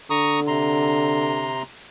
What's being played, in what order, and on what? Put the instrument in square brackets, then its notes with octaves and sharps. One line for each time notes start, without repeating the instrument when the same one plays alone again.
[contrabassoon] D3 [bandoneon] A#5 C#6 D#6
[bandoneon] C3 A#5 C6